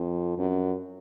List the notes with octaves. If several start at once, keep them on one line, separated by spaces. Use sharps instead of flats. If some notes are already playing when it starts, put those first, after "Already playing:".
Already playing: F2
F#2